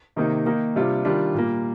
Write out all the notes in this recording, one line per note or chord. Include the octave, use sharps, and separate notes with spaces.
C3 D#3 A#3 D#4
D#3 A#3 D#4
C3 G3 D4 F4
D#3 G3 D4 F4
A#2 G3 A#3